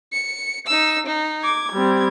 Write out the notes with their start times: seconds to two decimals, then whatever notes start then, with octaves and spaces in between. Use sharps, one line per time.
0.13 C#7
0.67 D#4 E6
1.06 D#4
1.44 D6 G#6
1.73 G3 C4